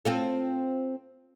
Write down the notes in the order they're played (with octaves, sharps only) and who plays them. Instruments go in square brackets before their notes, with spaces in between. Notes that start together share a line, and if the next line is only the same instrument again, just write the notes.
[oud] C4 F4 A4